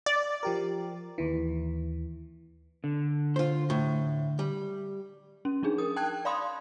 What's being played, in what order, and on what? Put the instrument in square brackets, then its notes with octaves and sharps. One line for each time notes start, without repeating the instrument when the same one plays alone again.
[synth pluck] D5
[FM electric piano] F3 G4 A#4
D#2 E3
[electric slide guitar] D3
[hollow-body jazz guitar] F4 C5
A2
G3
[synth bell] C#4
F3 D4 D#4 G#4
A#4 D#6
G5 A5 F#6 G#6
D5 F5 B5 C6 D#6